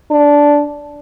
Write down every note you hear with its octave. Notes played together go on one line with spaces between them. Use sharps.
D4